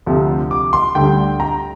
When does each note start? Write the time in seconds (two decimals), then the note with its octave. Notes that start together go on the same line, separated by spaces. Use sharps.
0.06 D2 C3 F3
0.51 D6
0.73 C6
0.95 D2 D3 G3 G5
1.40 A#5